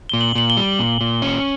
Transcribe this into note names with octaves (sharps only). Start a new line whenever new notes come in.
A#2 G7
F#7
A#2 F#7
G7
G3
A#2
A#2
C#4